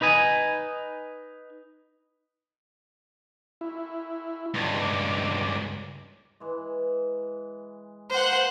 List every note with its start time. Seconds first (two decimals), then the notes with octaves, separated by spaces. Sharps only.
0.01 D#4 B4 D#5 G#5
3.61 E4
4.54 C#2 G2
4.82 D6
6.40 E3 G#3
8.10 A#3 B4 C5 F#5